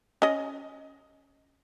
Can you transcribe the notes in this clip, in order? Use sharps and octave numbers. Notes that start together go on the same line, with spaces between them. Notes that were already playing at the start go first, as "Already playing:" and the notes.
C#4 D#5